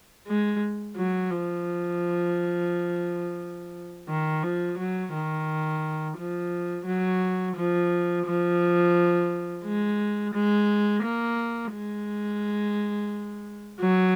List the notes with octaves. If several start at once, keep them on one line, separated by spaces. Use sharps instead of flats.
G#3
F#3
F3
D#3
F3
F#3
D#3
F3
F#3
F3
F3
G#3
G#3
A#3
G#3
F#3